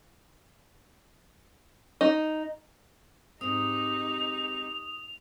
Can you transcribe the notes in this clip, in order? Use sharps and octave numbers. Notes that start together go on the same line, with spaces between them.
D#4
G#2 C4 D#4 G4 D#6 F7